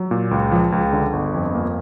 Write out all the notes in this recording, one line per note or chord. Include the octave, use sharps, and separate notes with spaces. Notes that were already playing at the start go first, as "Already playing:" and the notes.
Already playing: F#3
A#2
C#2
F3
C#2
D3
G1
F2
A#3